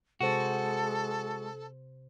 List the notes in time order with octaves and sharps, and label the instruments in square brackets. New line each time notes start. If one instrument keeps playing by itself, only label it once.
[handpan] C3 C5 [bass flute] G#3 [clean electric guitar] F#4 [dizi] A4